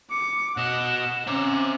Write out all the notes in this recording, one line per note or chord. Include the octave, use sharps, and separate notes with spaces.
D6 C#7
B2 D#5 F#5 E7
C4 C#4 A#5 D6